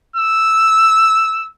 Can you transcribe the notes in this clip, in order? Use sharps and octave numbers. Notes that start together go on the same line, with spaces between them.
E6